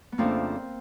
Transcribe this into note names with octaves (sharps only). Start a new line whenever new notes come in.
B3
F2 C#3 F3 A3 A#3 C4 D4